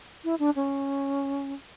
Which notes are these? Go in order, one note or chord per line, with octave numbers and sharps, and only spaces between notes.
E4
D4
C#4